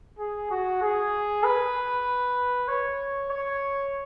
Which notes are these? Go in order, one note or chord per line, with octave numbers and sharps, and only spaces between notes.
G#4
F#4
G#4
B4
C#5
C#5